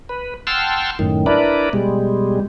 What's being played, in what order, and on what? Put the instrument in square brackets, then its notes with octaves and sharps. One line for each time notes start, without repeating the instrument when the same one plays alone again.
[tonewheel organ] B4
F#5 G5 A5 C6 E6 F6
F#2 A2 D#3
D4 E4 A#4 B4 D5
B2 G3 G#3